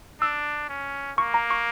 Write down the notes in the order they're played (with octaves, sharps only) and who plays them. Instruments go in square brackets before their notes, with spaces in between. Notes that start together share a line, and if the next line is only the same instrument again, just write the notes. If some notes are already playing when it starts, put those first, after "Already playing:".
[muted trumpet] D4 [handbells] E6
[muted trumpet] C#4
[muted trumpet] A#3 [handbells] C#6
[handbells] A#5
C#6